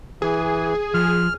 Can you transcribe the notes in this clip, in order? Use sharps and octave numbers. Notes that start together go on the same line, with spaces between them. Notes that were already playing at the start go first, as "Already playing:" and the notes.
E3 G#4
F3 F6